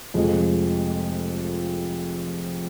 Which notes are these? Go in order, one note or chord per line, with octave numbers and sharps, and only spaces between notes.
F1 F2 F3 G#3